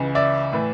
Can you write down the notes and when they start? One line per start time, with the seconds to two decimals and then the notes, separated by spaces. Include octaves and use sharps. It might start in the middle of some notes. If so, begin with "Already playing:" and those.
Already playing: C#2 C#3 E3
0.15 D5 E5
0.53 A2 E3